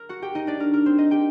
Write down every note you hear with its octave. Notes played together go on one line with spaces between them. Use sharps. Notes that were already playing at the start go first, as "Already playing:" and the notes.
Already playing: A#4
F#4 F#5
G4 G5
D#4 D#5
D4 D5
A#4
A#4
C4 C5
D#4 D#5
G4 G5